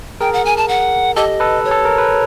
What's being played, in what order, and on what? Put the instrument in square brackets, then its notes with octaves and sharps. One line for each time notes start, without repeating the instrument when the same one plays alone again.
[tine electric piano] G#4 A#4 [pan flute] G5
[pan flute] F#5
G#5
A5
F#5
[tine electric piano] G4 A4 [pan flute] D#5
[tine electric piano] A4 B4
[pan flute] C#5
[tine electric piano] A4
A#4
B4